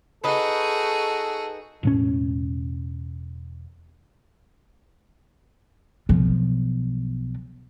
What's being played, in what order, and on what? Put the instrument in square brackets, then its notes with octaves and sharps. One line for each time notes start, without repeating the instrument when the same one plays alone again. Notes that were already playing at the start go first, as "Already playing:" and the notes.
[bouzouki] D#4 B4 [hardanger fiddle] F#4 G#4 [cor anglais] A4
[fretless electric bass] E1 A2 C#4
[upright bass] B1 F3